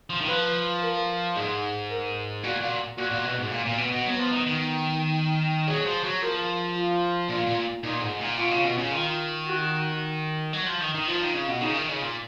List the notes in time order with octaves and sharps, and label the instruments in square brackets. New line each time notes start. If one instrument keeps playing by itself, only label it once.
[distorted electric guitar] F3
D#3
[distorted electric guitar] F3 [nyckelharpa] B4
[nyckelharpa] A#4
[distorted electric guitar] G#2 [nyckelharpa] G#4
[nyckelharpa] A#4
[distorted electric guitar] A#2 [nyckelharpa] F#4
[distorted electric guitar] A#2
[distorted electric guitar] A#2 [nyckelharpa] F#4
[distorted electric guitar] A#2
B2
G#2
A#2
A#2
B2
B2
[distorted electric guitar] F#3 [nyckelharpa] B3
[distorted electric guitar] F3
D#3
D#3
[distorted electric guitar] F#3 [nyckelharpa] G#4
[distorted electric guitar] F3
F#3
[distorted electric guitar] F3 [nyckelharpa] A#4
[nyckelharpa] F4
[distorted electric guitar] A#2 [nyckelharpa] F4
[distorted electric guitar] A#2
[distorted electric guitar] A#2 [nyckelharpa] D#4
[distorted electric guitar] G#2
A#2
[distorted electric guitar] B2 [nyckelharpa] F4
[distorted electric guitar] C#3
B2
C#3
[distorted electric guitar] D#3 [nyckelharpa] F4
[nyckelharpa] F#4
[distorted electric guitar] F#3
F3
D#3
D#3
[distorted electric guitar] F3 [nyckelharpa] F4
[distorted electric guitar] D#3
C#3
B2
[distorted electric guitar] C#3 [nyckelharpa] D#4
[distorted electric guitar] D#3
C#3
A#2